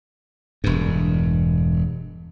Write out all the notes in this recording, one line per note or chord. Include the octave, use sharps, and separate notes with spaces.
E1 G2